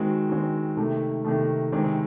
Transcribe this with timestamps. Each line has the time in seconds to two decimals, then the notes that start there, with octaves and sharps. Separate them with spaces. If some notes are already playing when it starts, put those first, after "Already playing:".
Already playing: D#3 G#3 C4 F#4
0.30 D#3 G#3 C4 F#4
0.77 C3 D#3 A3
1.25 C3 D#3 A3
1.72 C3 D#3 G#3 C4